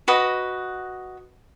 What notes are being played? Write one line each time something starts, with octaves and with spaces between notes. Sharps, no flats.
F#4 B4 D#5